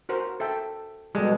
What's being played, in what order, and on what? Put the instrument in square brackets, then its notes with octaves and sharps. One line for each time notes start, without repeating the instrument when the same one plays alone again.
[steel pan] F#4 A#4 C5
A4 E5 G5
[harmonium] B2 [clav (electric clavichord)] G3 G#3 [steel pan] A4